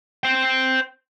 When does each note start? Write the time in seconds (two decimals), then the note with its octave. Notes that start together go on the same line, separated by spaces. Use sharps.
0.23 C5 G5